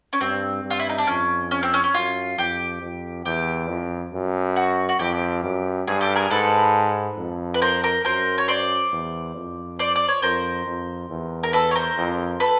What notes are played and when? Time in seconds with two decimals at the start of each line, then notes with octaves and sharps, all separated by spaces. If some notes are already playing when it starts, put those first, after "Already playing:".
0.13 C#4
0.20 G2 C4
0.64 G2
0.70 F4
0.80 E4
0.89 D#4
0.98 D4
1.07 F2 C#4
1.51 C#4
1.63 C4
1.74 C#4
1.84 C#4
1.94 F#2 F4
2.38 F2 G4
2.82 F2
3.25 E2 G4
3.69 F2
4.13 F#2
4.56 F#4
4.89 F#4
4.99 F2 G4
5.43 F#2
5.87 G2 G#4
6.01 G4 A4
6.15 G#4 A#4
6.30 G#2 A4 B4
7.18 F2
7.54 B4
7.62 A#4 C5
7.83 A#4 C5
8.05 F#2 A#4 C5
8.38 C#5
8.48 C5 D5
8.92 E2
9.35 F2
9.79 C5 D5
9.95 D5
10.08 C#5
10.22 F2 A#4 C5
10.67 F2
11.10 E2
11.43 A#4
11.53 A4 B4
11.71 C#5
11.75 A#4 C5
11.97 F2
12.40 A4 B4